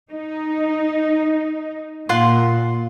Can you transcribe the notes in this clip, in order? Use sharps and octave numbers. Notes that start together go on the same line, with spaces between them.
D#4
A#2 F4 F#5 C6